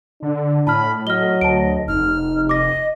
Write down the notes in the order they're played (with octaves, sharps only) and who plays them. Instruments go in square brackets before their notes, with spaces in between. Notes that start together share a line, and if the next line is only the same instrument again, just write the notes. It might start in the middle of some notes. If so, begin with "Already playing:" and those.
[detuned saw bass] D3 [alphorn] D4
[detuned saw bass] A2 [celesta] A5 F6 [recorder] B5
[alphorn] F#3 [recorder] D#5 [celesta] F6 G7
[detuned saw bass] D2 [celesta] A5 D7
[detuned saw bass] F1 [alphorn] D#4 [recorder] F6
[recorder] D#5 [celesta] D6 A#6